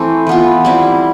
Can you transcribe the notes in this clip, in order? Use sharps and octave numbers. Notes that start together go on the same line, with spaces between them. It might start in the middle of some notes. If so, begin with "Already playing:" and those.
Already playing: E3 A3 C4
E3 B3 F4
G3 C4 E4